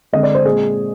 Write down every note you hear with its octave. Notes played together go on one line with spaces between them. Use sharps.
D3 G#3 C4 D#5
D5
C5
A#2 G#3 C4 G#4